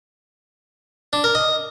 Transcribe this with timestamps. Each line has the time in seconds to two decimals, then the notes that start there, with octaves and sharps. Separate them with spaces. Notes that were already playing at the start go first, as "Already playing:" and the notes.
1.13 D4
1.24 A#4
1.35 D#5